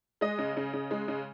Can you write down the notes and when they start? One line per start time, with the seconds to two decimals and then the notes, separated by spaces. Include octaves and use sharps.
0.21 G#3 D#5
0.38 C#3
0.57 C#3
0.73 C#3
0.91 G#3
1.08 C#3